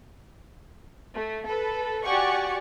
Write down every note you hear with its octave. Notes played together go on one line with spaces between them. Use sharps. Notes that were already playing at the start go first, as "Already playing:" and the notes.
A3
A4 B4
F#4 G4 D5 F#5 G#5 C#6